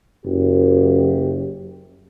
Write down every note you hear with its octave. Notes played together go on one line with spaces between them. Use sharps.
F#1 F#2 G4